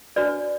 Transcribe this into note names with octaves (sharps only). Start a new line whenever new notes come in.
D4 F#4 B4 D5